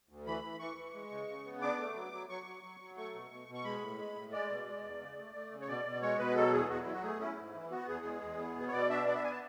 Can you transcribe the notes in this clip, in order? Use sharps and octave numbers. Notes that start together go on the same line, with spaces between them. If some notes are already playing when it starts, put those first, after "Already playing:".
D2
E3 B5
E3
E3 C#6
E3
G#3
C#3
C#3
B3
D4 D6
A3
F#3
F#3
F#3 C#6
F#3
F#3
F#3
A3 C#6
B2
B2
B2
C#6
G#3 B5
A2
G#3
A2
G#3 D5
B2
G#3
E2
C#3
A3
A3
C#3
C#5
B2 D5
B2
G#3 C#5
B2 B4
F#3 A4
E2 G#4
E2 F#4
E4
F#3
F#4
A3 G#4
C#4 E4
G#2
E3
B3 F#4
E2 G#4
G#3
E2
B3
B2
C#5
B2 D5
D4 E5
B3 D5
E5
G#5
A5